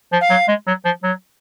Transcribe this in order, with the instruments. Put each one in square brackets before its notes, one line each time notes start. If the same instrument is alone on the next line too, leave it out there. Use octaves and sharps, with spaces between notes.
[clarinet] F3
[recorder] F5
[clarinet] F#3
G#3
F#3
F3
F#3